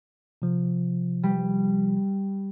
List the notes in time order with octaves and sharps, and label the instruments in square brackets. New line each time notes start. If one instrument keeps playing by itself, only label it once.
[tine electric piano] C3 F3
[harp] G3